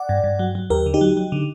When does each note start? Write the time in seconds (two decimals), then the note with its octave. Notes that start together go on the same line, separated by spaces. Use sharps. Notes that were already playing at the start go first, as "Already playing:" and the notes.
Already playing: D5 F#5
0.09 G2
0.24 G2
0.39 F#3
0.55 F#3
0.70 D#2 G4 A#4
0.86 D3
0.94 D#4 G4
1.01 F#3
1.17 F#3
1.32 D3